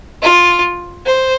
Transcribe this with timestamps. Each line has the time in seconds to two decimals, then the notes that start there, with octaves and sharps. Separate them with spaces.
0.22 F4
1.06 C5